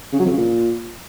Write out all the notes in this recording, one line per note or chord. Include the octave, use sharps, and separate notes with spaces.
C#3
F#3
F2
C#3
A#2